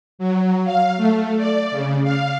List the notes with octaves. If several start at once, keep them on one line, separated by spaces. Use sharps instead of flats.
F#3
F5
A3
D5
C#3
F5